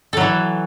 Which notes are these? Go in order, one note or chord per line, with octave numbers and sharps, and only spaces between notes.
E3 F#3 A4